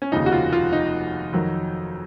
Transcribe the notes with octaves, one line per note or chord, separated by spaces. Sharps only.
C#4
F1 D#2 C#3 F3 D#4
F#4
F4
F4
D#4
F2 D#3 F#3